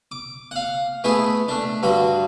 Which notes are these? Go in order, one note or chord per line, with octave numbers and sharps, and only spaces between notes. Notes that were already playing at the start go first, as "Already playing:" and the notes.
D6
F5 F#5
A3 B3 E4 G#4
A3 D4
G2 D3 F#4